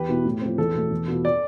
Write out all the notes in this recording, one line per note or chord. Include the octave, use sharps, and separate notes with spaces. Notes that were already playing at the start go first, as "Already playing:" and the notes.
Already playing: E2 G4 B4
B2 B3 E4
A2
F3 C4
E2 A4
B2 A3
E2
B2 B3 F4
D5